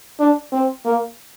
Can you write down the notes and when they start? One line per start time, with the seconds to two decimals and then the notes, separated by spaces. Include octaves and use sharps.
0.19 D4
0.52 C4
0.85 A#3